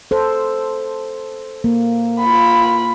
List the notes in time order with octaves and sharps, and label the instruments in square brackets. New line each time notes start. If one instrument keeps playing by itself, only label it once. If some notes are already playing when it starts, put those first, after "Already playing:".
[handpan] A4 C5
A#3
[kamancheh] F4 B5